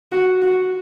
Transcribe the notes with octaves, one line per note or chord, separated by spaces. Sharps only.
F#4
F#4